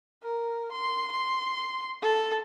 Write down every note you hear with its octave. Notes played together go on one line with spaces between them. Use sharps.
A#4
C6
C6
A4